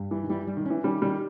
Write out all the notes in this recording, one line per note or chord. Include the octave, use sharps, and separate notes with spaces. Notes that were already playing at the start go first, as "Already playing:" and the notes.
Already playing: G2
E3 G3
D#3
E3 G3
G3
D#3
E3 C#4
D#3 G3 C#4
D#3 G3 C#4